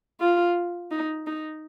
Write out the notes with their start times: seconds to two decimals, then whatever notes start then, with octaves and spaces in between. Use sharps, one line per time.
0.21 F4
0.91 D#4
1.27 D#4